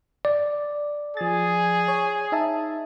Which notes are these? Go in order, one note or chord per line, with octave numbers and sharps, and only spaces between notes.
D5
F3 G#4 A6
C#5
D#4 E5 A5